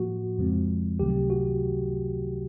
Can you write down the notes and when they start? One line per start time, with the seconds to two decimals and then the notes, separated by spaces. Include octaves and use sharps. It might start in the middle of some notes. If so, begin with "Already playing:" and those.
Already playing: A2 F3 A#3 F#4
0.38 F2 C#3 F3 G#3 C4
1.00 C#2 C3 D#3 F#3 A3 G4
1.30 F#4